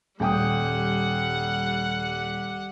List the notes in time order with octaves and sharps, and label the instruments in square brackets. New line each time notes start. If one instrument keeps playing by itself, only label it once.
[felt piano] D#1 G5 D#6 [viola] G3 F#5